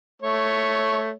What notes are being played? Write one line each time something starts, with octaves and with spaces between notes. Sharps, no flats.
A3 C#5